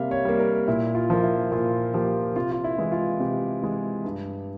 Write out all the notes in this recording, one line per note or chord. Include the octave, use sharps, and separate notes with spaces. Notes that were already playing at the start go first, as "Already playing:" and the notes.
Already playing: C3 G3 A#3 E5 F5
C#5
G3 A#3
A#4
A#2 E4
F4
F3 A#3
E4
A#2 F4
F3 A#3 G4
C3 F4
F4
E4
E3 G#3
F4
C3 G4
E3 G#3
G2